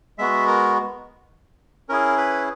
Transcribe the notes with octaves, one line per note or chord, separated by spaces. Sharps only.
G#3 B3 F#4 E5
A#4
C#4 E4 G#4 A#4
B4